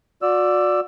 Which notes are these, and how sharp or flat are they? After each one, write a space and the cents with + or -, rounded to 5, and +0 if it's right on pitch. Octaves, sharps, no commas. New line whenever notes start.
F#4 -35 D5 +0 E6 +15